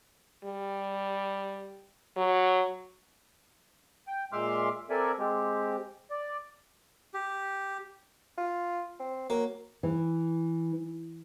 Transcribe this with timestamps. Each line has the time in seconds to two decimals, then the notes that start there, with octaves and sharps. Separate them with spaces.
0.45 G3
2.17 F#3
4.07 G5
4.33 A#2 G#3 E5 C6 D6 F6
4.90 C4 A4 A#4 D5 E5 G#5
5.19 G#3 C4 G4
6.11 D5
7.14 G4
8.38 F4
9.00 C4
9.30 F#3 A#3
9.83 E3